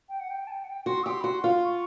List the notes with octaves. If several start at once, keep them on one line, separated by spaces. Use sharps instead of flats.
G5
F#5
G5
A5
G5
F#5
G5
F#4 C6
G4 C6 E6
B5
F#4 C6
F4
C#6